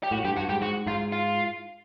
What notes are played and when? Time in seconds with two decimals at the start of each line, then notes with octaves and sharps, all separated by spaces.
0.03 G4
0.11 A2 F#4
0.24 G2 G4
0.37 G2 F#4
0.49 G#2 G4
0.61 G#2 F#4
0.86 G#2 F4
1.12 F4